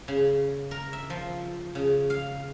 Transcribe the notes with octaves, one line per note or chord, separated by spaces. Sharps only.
C#3
A#4
E5
F3
C#3
F5